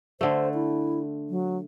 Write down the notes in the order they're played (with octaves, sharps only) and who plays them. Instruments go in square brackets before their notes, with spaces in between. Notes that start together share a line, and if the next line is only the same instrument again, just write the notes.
[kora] D3 A3 [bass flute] C5
[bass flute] E4
F#3